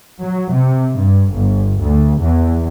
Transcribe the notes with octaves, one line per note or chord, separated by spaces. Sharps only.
F#3
C3
G2
G1
D2
E2